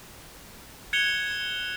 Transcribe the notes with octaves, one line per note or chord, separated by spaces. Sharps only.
F#6 G#6 C#7 E7 F7 G7